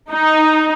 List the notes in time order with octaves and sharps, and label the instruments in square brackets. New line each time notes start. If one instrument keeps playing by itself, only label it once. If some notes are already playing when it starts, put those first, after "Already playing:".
[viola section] D#4